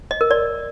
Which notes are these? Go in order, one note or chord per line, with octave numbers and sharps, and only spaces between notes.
D#5
A#4
D5